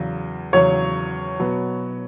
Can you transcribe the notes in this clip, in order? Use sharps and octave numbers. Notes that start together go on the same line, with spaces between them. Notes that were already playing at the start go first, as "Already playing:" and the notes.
Already playing: E2 C#3 F#3
E2 C#3 F#3 C#5
B2 F#3 B3